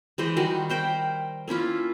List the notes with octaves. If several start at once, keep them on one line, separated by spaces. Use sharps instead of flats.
E3 G#3 C5 D#5
D#3 G3 F#4
A#4 C5 G5 B5
A#3 C#4 E4 F4